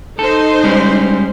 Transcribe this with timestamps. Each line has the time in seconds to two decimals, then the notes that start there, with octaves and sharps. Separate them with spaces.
0.19 D#4 A4 C5
0.64 G3 G#3 C#4